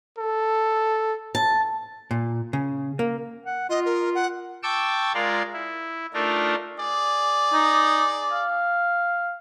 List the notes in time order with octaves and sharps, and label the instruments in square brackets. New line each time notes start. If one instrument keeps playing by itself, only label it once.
[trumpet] A4
[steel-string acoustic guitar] A5
[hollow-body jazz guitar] A#2
C#3
A#3
[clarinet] F#5
[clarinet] F4 [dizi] D#5
[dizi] A#4
F#5
[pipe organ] G5 A5 C#6 D6 E6
G#3 F4 A#4 D5 C6
E4
A3 D4 D#4 F4 A#4
[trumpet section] G#4 D5
[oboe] D#4
F5